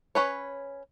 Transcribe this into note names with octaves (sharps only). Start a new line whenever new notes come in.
C#4 B4 C#5